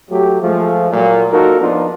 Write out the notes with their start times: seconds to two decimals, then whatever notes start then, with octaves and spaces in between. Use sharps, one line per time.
0.10 F#3 A3 G4
0.42 F3 G#3 A3
0.93 A#2 F#3
1.32 A#3 D#4 F4 F#4 A4 A#4
1.61 F3 B3 D4 D#4 F4